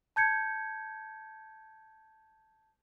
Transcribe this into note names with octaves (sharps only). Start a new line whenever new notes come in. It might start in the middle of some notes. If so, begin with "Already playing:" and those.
A5 G6 G#6 C#7